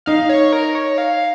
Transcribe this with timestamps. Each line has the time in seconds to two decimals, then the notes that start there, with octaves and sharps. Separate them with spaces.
0.06 D#4 F5
0.29 C#5
0.53 A#4
0.75 C#5
0.98 F5